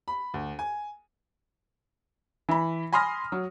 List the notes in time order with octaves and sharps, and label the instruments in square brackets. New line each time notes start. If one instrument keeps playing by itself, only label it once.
[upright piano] B5
D2
G#5
[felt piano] E3 B5
G#5 B5 C6 D#6 F6 A#6
F#3